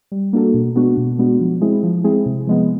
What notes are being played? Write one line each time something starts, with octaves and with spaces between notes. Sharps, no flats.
G3
A#3 D4 F#4 A4
B2
G#3 B3 D4 F#4
B2
G#3 B3 D4 F#4
F3
G#3 C4 E4 G#4
F3
G#3 C4 E4 G#4
C3
F3 G#3 B3